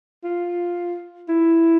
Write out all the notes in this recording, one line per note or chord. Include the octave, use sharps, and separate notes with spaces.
F4
E4